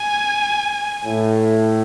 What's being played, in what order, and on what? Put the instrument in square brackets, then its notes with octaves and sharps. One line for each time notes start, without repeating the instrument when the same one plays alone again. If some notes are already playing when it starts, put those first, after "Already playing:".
Already playing: [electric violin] G#5
[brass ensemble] A2